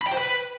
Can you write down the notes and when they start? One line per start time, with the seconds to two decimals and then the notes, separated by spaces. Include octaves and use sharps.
0.02 B5
0.07 G5
0.12 C5
0.18 B4